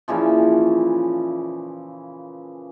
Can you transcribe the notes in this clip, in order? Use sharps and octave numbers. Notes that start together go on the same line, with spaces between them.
A#2 C#3 E3 F3